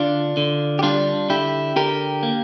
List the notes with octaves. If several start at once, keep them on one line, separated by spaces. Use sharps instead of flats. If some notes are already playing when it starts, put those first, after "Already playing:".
Already playing: D3 D4 F4
D3
G4
G3 D4 F4
D3 E4 G4
D3 G4 A#4
A#3